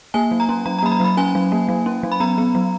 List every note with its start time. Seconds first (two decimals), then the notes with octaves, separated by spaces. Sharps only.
0.14 A#3 G#5
0.31 F#3
0.40 A#5
0.49 C#4
0.66 F#3 A#5
0.78 A#5
0.83 A#3 B5
0.92 A#5
1.00 F#3 B5
1.17 C#4 G#5
1.35 F#3
1.52 A#3
1.69 F#3
1.86 C#4
2.03 F#3
2.12 B5
2.20 B3 A#5
2.38 B3
2.55 F#3